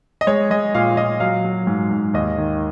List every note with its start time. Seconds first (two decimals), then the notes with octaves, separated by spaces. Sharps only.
0.21 D#5
0.27 G#3 C#5
0.50 G#3 D#5
0.75 A#2 F5
0.97 A#2 D#5
1.20 F#3 F5
1.44 F#3
1.67 G#2
1.91 G#2
2.14 D#2 D#5
2.38 D#3